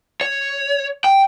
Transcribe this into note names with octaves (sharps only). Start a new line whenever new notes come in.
C#5
G5